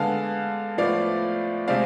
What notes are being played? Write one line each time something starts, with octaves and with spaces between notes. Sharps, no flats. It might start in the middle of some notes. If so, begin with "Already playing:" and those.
Already playing: D3 G#3 B3 F5 A5
A2 F3 B3 D5 F5
C3 G#3 C4 D5 F5